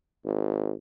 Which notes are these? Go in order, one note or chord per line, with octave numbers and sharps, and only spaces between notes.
G#1